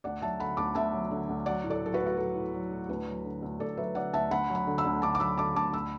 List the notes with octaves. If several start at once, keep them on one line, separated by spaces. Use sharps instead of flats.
D2 D5 F#5
F#3 E5 A5
D3 F#5 B5
D2 A5 D6
D2 E5 A5
F#3
D3
D2
F#3 D5 F#5
A2
A4 D5
F#3 A4
F#4 B4
A2
F#4
F#3 A4
A2
F#3
A2
D2 F#4 B4
F#3
D3
D2
D2 A4 D5
F#3 B4 E5
D3 D5 F#5
D2 E5 A5
D2 F#5 B5
F#3
F#5 B5
D3
B5 E6
D2
D2 A5 D6
D6
F#3 B5 E6
D3 A5 D6
D2 A5 D6
D2 B5 E6